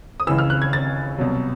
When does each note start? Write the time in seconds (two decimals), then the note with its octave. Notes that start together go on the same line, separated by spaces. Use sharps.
0.20 D#6
0.27 C#2 C#3 E3 E6
0.38 F6
0.50 F#6
0.62 G#6
0.73 A6
1.18 C2 B2 F#3